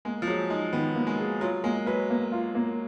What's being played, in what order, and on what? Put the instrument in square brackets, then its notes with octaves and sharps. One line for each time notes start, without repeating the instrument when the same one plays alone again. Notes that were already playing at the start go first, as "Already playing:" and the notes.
[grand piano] G#3 [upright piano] A#3
[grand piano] F3
[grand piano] F#3 [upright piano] G#4
[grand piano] G#3 [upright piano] D#4
[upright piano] D#3 [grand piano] B3
[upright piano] A#3
[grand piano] G#3
[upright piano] G#4
[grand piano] F#3 [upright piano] F4
[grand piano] G#3 [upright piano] A#3
[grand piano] F#3 [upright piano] B4
[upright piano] A#3
F4
A#3